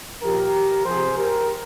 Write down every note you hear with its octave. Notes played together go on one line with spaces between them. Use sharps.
A#2 F3 G4 A#4
C3 F3 G#4 C5
G4 A#4